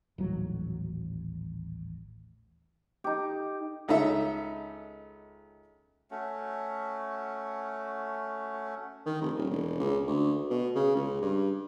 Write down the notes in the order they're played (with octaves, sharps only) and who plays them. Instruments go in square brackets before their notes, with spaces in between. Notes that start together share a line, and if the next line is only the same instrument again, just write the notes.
[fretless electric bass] D#1 A1 F#3
[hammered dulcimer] D#4 G4
[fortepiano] C#2 D#4 A4 D#5 E5
[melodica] A3 C#4 F#4
[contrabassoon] D#3
F1
D#1
E1
C#2
D2
B2
C#3
C#2
G2